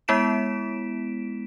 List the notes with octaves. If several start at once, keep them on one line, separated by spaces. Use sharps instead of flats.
G#3 B3 E4 B6 D7 E7